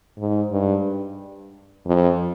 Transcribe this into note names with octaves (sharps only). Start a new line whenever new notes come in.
G#2
G2
F2